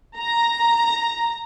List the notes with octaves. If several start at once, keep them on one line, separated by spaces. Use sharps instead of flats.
A#5